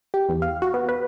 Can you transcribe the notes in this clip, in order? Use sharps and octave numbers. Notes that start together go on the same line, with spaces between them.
G4
E2
F5
F#4
B3
B4